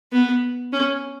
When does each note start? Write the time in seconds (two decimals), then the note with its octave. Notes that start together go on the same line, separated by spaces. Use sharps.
0.12 B3
0.72 C#4